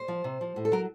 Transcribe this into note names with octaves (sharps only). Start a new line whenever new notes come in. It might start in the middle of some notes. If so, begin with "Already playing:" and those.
Already playing: C5
F3
C3
F3
A2
A4
F#3 A#4